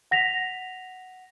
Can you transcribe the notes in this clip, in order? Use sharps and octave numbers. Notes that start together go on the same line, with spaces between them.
F#5 A#6 B6 F7